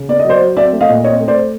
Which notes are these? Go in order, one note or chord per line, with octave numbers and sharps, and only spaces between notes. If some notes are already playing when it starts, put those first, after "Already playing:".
Already playing: C#3
B3 D5
D#5
F#3
C5 D5
F#3
C4 D5 E5
A3
D#5 F5
A#2
C4 C#5 D#5
A3
C5 D5
A3